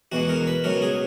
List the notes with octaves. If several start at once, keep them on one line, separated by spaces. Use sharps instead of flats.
E2 B2 G#3 F#4
A#4
B4
C#2 B2 F#3 A#4
G#4